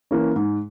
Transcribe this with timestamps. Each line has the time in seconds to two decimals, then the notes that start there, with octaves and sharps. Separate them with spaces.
0.11 E3 A#3 C#4
0.36 G#2